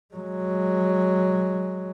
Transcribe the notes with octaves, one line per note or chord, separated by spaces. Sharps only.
F#3 G#3